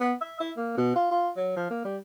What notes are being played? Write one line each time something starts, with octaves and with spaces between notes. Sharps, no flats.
B3
E5
E4
A#3
B2
F4
F4
F#3
F3
A#3
G3